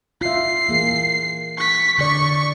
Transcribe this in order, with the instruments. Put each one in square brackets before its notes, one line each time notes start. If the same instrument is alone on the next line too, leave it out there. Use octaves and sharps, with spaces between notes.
[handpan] F4 E5 [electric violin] C7
[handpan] E3 A#3 G#4
[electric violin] C#6 B6
[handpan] D3 D5 [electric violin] C#6